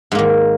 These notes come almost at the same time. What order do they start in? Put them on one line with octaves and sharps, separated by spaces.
G#2 A#3 D#3